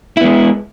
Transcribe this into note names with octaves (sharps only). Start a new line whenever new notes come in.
G#3 B3 E4